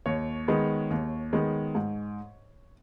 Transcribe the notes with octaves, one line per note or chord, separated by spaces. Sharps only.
D#2 C#5
D#3 G#3 B3
D#2
D#3 G#3 B3
G#2